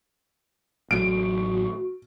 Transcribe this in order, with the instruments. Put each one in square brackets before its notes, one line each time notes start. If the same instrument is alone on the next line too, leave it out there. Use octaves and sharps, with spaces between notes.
[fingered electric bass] A1 A2 F#3 [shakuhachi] F#4 [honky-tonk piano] D7